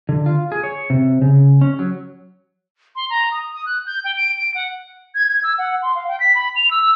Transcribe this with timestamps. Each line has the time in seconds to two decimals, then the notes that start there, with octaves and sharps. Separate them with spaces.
0.09 D3
0.26 F4
0.52 G#4
0.63 C#5
0.90 C3
1.22 C#3
1.61 C#4
1.79 F#3
2.96 C6
3.10 A#5
3.31 D#6
3.53 D#6
3.66 F#6
3.86 G6
4.04 G5
4.17 D7
4.38 D7
4.54 F#5
5.15 G#6
5.28 G#6
5.43 E6
5.58 F#5
5.82 C6
5.95 F5
6.08 G5
6.20 B6
6.35 B5
6.56 F7
6.71 E6
6.82 E6